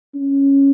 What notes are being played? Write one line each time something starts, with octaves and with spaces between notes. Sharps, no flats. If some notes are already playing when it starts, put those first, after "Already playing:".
C#4